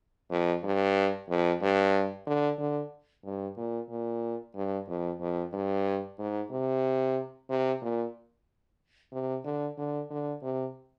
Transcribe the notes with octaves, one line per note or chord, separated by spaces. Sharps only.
F2
G2
F2
G2
D3
D3
G2
A#2
A#2
G2
F2
F2
G2
G#2
C3
C3
A#2
C3
D3
D3
D3
C3